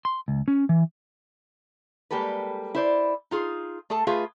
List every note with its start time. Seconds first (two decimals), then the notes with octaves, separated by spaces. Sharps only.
0.05 C6
0.28 C#2
0.48 C#4
0.69 E3
2.11 G3 G#3 A#3 G4 A4 B4
2.75 E4 C5 D5
3.31 D#4 F4 G#4
3.90 A3 G#4 A4 A5
4.07 A3 F4 G#4 B4 F5